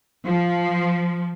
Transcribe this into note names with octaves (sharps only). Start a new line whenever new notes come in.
F3